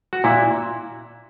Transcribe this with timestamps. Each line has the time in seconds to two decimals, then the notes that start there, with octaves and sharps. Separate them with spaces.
0.13 F#4
0.24 A#2 E4